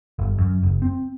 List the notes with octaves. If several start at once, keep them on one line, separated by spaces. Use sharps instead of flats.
G1
F#2
F#1
C4